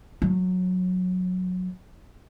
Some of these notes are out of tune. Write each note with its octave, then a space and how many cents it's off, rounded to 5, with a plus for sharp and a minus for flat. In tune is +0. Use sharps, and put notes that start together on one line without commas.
F#3 -15